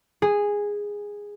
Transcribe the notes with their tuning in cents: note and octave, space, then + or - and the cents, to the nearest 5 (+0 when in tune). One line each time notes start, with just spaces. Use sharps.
G#4 -10